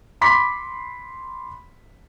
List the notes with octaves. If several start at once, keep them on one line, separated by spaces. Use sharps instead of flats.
B5 C6 D6 B6